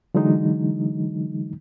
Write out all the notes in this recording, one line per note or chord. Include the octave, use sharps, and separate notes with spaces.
D3 E3 F#3 G#3 D#4